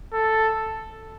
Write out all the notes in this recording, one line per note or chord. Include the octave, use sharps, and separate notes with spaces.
A4